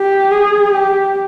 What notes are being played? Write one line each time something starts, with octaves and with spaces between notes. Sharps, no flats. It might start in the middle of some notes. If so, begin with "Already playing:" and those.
Already playing: G4
G#4
G4